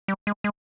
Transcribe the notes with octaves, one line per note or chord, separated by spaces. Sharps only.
G3
G#3
G#3